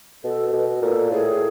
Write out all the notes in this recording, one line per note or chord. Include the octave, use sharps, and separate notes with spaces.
B2 A4
B2
A#2 A4
A2 G#4